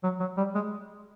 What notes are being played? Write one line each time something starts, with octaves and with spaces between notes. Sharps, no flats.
F#3
F#3
G3
G#3